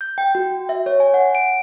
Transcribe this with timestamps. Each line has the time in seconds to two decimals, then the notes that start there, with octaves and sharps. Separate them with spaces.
0.01 G6
0.18 G5
0.35 F#4
0.69 E5
0.86 C#5
1.00 G#5
1.14 F#5
1.35 D7